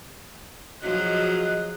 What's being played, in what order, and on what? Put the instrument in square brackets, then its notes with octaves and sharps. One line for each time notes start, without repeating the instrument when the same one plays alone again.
[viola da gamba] F3 F#3 G#4 [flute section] F#4 D#5 F#6